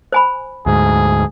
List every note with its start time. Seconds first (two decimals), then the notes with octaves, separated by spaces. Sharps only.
0.12 C5 G#5 B5
0.66 D2 G#2 G#4